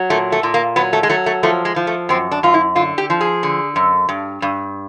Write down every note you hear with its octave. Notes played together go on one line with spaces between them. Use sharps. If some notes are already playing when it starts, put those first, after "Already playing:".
Already playing: F#3
A#2 A3
A3
A#2
A#3
F#3 B3
A3
G#3
F#3 A3
A3
F3 A3
G#3
F3
A3
F#2 C4
D4
F#2 F4
E4
D3 F4
G4
F3
G#4
D3
F#2
G2
G2